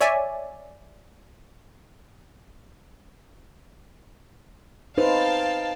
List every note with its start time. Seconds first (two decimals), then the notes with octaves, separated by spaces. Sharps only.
0.01 C#5 D5 E5 G#5
4.98 D#4 B4 C5 F5 G5 A5